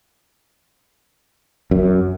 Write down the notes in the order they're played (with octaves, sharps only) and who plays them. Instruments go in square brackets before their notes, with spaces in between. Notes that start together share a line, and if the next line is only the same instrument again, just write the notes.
[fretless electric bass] F#2